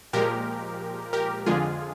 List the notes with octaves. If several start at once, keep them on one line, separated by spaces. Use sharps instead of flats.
A#2 F3 G#3 G4 A#4
G4 A#4
F2 D3 F3 G#3 F4 G#4